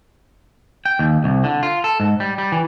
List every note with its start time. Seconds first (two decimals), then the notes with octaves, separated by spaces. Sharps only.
0.85 G5
0.99 D#2
1.24 C2
1.44 D3
1.63 F4
1.84 A4
2.00 G#2
2.20 G3
2.38 G3
2.52 E3